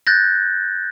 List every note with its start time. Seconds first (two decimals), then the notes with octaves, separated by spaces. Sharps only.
0.07 F#6 G6 A6 A#6